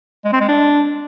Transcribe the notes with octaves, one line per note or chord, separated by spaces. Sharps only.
G#3
C4
G#3
D4